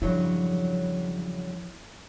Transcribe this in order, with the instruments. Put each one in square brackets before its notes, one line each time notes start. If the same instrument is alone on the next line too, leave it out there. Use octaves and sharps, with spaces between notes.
[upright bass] E2 F3 [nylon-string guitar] G2 C#3 F#3 [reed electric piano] E4 C#5